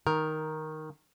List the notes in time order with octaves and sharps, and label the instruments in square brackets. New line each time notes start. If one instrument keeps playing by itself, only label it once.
[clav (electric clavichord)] D#3 [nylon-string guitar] A#4